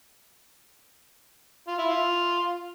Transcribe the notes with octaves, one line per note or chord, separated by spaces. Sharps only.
F4
E4
F4